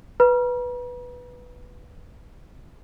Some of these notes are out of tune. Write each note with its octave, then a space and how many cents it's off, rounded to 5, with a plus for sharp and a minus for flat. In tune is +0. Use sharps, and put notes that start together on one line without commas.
B4 +0 A#5 +45